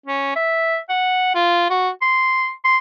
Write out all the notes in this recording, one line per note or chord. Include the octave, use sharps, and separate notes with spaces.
C#4
E5
F#5
F4
F#4
C6
C6